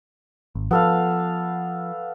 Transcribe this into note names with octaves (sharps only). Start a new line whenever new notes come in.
G#1
F3 B3 A4 F5